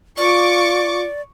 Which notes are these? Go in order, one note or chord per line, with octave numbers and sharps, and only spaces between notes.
F4 D5 C#6 D6